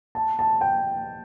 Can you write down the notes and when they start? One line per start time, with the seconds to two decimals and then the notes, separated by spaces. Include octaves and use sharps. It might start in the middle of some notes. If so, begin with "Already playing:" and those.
0.15 A5
0.39 A5
0.61 G5